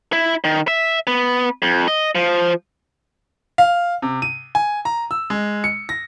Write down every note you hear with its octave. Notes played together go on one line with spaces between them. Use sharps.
E4
D#3
E5
B3
F2
D#5
F3
F5
C3
D#7
G#5
A#5
E6
G#3
C#7
A#6